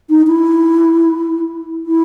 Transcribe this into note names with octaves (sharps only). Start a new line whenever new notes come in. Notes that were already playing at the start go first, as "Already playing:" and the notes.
D#4
E4
E4